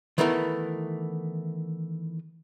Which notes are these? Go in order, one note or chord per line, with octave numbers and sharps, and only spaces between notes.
D#3 E3 A3 B3 E4 A#4